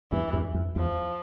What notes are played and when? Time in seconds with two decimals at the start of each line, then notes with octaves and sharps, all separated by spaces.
0.12 E2 G2 E3
0.33 E2 G2
0.54 F2
0.76 E2 F3